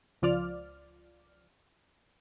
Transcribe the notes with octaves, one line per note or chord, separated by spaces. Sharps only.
C#2 F3 F4 D5 F6